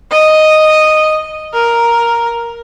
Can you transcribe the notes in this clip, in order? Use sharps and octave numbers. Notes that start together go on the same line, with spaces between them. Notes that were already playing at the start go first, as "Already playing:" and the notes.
D#5
A#4